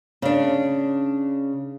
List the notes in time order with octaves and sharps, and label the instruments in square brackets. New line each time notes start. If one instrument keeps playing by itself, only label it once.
[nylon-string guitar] C#3 D4